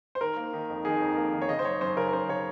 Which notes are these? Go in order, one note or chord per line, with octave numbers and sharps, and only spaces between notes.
C5
D#3 A#4
A#3
D#3
F2
D#3 G#4
F2
A#3
D#3
C#5
C#3 D#5
C5
F#2 C#5
F#2 C5
C#3 A#4
A#4
F#2 C5
C#3 C#5